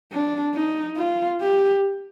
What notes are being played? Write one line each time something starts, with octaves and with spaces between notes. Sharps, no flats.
D4
D#4
F4
G4